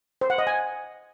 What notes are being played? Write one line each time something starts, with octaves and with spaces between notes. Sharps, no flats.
C5
F#5
D#5
G#5